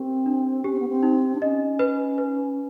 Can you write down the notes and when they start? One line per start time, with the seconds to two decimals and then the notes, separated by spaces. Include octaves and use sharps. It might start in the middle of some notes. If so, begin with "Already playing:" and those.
Already playing: C4 G4 A#4
0.26 D4
0.64 C#4 G4
0.72 C4
0.80 B3
0.88 C4
1.03 D#4
1.35 D4
1.41 C#4 D#5
1.79 B4
2.18 B4